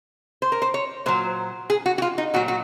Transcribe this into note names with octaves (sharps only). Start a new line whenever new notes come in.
C5
A#4
C5
C#5
A#2 F#3 C5
G#4
F#4
F#4
F4
D#4
A#2 F#3 F#4
F#4